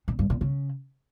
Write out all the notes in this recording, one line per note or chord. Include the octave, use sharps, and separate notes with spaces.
A#2
G2
A#2
C#3